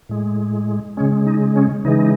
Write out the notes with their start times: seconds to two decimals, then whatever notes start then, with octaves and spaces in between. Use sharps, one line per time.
0.09 A2 G#3
0.97 C#3 G#3 C#4
1.26 D#4
1.56 C#4
1.84 C#3 E3 G#3 D#4